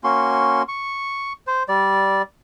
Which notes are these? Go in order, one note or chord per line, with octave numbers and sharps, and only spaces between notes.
A#3 C#4 F#4 C6
C#6
C5
G3 D5